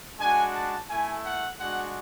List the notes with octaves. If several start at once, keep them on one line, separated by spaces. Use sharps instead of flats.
G#3 D4 F#4 G#5
A5
A3 E4 G#5
F#5
G#3 D4 F#4 F#5